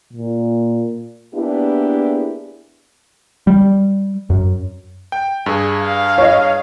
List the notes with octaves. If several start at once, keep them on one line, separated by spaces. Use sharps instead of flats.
A#2
A#3 B3 D4 E4 G4 G#4
G3
F#2
G5
G2 G#4
F5
C#5 D#5